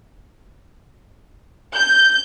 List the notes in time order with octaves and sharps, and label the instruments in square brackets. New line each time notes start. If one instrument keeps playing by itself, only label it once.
[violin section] G6